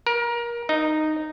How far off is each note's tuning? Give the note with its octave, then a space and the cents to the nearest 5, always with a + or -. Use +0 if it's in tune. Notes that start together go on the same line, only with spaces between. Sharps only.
A#4 +25
D#4 -10